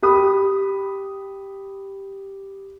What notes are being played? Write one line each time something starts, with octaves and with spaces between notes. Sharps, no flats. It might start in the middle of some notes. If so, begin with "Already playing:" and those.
G4 B5 D#6